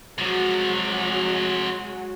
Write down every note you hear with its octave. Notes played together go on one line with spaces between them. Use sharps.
C3 F3 F#3 G#3 F#4